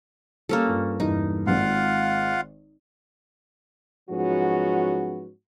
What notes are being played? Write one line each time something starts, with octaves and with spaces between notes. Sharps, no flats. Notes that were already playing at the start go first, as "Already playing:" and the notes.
G3 A#3 C#4 A4
G2 F4
E1 G2 D#4 E4
G#1 G#2 F4 F5 F#5
G#2 F3 F#3 B3 C#4 F#4